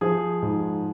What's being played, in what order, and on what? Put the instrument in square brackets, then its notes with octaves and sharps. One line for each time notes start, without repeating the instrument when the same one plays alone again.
[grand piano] F3 [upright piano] G#4
[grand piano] G#2